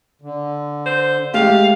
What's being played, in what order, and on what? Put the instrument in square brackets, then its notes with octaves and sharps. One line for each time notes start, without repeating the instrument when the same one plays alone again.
[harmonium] D3
[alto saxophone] C5
[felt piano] G#3 A3 [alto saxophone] G4 [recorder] F5